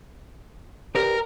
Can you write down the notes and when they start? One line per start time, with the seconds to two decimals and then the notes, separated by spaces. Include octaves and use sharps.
0.95 G4 A#4 B4 D5